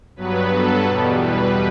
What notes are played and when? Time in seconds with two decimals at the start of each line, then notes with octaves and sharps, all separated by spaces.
0.16 G2 F#3 B3 B4
0.51 A4
0.86 E2 B2 G3
1.20 B4